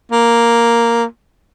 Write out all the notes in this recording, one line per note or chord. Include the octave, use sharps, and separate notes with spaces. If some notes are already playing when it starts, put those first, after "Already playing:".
A#3